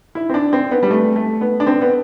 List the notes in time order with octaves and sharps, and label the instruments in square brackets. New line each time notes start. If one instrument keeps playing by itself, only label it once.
[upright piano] E4
C4
D4
C4
B3
G3
A3
A3
B3
D4
C4
B3